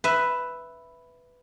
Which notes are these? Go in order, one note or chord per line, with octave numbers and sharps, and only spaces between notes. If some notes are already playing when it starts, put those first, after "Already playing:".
B4 E5